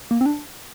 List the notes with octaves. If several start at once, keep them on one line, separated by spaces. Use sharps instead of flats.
A#3
C4
D4